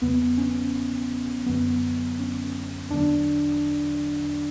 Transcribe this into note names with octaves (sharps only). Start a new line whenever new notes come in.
E2 C#3 F#3 B3
C#4
F#2 D3 F#3 B3
C#4
E2 D3 F#3 D4